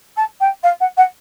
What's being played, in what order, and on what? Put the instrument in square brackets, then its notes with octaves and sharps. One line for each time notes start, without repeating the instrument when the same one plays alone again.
[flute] A5
G5
F5
F#5
F#5